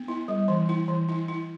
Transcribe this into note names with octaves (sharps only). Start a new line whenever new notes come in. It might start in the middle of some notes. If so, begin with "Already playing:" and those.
Already playing: B3
E4
G3
E3
E4
E3
E4
E4